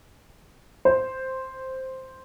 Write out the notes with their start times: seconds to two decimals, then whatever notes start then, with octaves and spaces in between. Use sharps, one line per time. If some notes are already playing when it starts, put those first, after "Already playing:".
0.85 C5